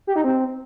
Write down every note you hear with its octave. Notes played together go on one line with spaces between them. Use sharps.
G4
D#4
C4